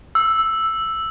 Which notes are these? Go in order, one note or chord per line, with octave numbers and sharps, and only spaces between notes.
E6